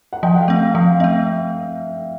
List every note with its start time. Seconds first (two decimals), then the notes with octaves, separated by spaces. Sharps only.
0.13 F#5
0.23 F3 G5
0.35 F#5
0.41 F5
0.48 A3 C4
0.57 F#5
0.74 F3 F5
1.00 A3 C4 E5